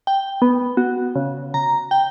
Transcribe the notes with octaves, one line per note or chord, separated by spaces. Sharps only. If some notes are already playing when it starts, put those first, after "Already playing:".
G5
B3
F#4
C#3
A#5
G5